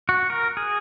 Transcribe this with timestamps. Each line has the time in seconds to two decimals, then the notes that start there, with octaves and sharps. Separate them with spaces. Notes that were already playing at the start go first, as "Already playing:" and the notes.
0.09 F#4
0.30 A#4
0.57 G#4